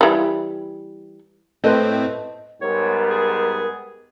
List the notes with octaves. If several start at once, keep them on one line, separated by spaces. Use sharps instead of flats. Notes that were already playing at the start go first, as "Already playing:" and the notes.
E3 G3
A2 C4 A4 B4 C5 D#5
G#2 G3 B3 A#4 C#5
G#4